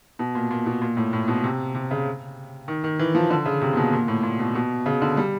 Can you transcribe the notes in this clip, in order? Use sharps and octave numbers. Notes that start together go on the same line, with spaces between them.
B2
A#2
A#2
B2
A#2
A2
A2
B2
C3
C3
C#3
D#3
D#3
E3
F3
D3
C#3
C3
A#2
B2
A#2
A2
A#2
B2
B2
C#3
D3
G3